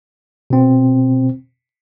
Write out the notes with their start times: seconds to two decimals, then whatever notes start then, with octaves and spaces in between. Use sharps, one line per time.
0.50 B2 C4